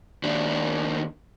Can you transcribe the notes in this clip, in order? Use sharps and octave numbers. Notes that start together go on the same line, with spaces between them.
D#2 D4